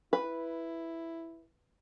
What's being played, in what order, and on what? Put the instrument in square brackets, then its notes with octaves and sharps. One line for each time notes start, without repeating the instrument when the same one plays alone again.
[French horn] E4 [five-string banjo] B4